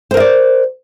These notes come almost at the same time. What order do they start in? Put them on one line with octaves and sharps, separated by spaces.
C5 A#4 D#5 D5